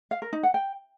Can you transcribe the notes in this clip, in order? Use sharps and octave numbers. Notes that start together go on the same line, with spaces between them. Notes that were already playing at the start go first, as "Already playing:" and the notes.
F5
A#4
D#4
F#5
G5